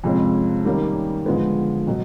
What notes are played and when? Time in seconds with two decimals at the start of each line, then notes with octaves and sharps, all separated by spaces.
0.04 F2 C3 F3 G#3 C#4
0.65 D#3 G3 A#3 C#4
1.26 D3 F3 G#3 B3
1.87 B2 F#3